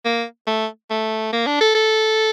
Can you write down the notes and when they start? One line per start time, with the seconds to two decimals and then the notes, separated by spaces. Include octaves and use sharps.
0.05 A#3
0.47 A3
0.91 A3
1.33 A#3
1.47 D4
1.61 A4
1.75 A4